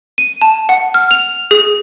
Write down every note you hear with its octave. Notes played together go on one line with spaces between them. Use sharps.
D#7
A5
F#5
F6
F7
G#4